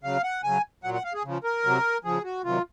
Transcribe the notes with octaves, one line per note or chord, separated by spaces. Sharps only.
C#3 F#3 F5
F#5
C#3 F#3 G#5
A#2 F#3 F#5
F#5
F5
G#4
C#3 F3
A#4
C3 F#3
C#3 F3 G#4
F#4
C3 D#3 F#3 F4